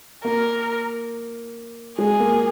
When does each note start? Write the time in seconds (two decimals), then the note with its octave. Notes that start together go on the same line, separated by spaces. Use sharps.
0.24 A#3 A#4
1.98 G#3 G#4
2.20 A#3